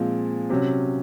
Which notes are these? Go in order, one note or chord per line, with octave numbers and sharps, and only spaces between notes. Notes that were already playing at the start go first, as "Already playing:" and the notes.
Already playing: A#2 F3 G#3 C4
C3 F#3 C#4